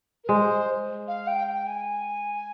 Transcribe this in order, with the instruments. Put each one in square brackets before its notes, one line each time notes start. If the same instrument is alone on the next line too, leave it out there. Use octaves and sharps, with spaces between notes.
[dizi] A#4
[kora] G#3 [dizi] C5
[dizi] F5
G5
G5
G#5